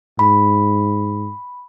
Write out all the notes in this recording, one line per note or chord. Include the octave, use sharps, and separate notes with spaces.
G#2 B5